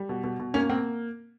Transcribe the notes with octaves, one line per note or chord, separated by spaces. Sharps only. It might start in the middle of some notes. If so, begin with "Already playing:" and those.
Already playing: G3
B2
B2
B2
A#3 C#4
A#3 C4